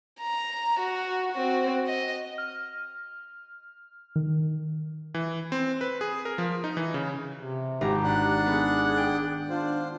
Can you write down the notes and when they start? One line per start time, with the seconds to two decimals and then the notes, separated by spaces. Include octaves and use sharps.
0.21 A#5
0.80 F#4
1.32 C4 F#4
1.87 D#5
2.38 F6
4.16 D#3
5.14 E3
5.52 C4
5.81 B4
6.01 G#4
6.25 A#4
6.38 F3
6.64 D#4
6.77 E3
6.94 C#3
7.36 C3
7.81 G#1 G4 A#5
8.04 D4 F#5
8.46 B3 G#4
8.98 G5
9.50 D4 F4 C5